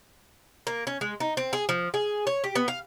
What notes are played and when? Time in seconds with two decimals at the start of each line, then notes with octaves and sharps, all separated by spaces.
0.67 A#3
0.87 C#4
1.01 G#3
1.20 D#4
1.37 C4
1.53 G#4
1.69 F3
1.94 G#4
2.27 C#5
2.44 G4
2.55 B3
2.68 F5